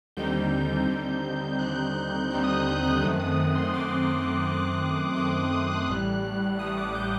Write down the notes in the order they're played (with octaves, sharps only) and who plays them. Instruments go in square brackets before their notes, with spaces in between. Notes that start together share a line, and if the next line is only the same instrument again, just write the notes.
[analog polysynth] D#2 D3 G3 C4 D#4 G6
D#2 D3 G3 C4 D#4
D#2 D3 G3 C4 D#4 F#6
D#2 D3 G3 C4 D#4 G6
D#6
F#6
G6
F#6
F#2 D#3 A3 C4 D#6
F#6
D#6
C6
F#2 D#3 A3 C4 D6
F#2 D#3 A3 C4
F#2 D#3 A3 C4 C6
D6
D#6
F#6
A1 A2 G3 F#6
A1 A2 G3 D#6
D6
G6